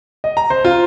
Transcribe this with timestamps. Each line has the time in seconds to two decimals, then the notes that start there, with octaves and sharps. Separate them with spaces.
0.24 D#5
0.37 A#5
0.50 C5
0.65 F4